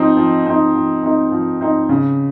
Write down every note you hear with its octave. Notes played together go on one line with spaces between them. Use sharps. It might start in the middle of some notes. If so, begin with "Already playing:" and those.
Already playing: F3 C4 D#4
F3
C4 D#4
F3
C4 D#4
F3
C4 D#4
C#3